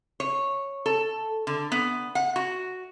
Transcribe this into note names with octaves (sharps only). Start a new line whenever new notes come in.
C#5
A4
D3
B3
F#5
F#4